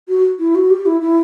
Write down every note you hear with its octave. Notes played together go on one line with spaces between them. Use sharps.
F#4
E4
F#4
G4
E4
E4